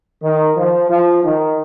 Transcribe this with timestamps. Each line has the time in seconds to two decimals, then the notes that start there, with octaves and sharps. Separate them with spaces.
0.22 D#3
0.57 F3
0.90 F3
1.24 D#3